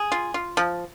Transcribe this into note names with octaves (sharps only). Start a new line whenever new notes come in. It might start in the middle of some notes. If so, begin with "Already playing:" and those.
Already playing: G#4
F4
F4
F3